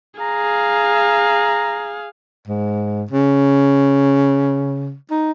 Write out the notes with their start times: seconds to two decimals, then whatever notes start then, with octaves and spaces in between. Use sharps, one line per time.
0.21 G#4 F5 A#5
2.48 G#2
3.11 C#3
5.11 D#4